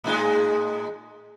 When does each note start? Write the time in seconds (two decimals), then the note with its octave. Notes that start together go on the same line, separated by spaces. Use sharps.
0.04 A2 G#3 D#4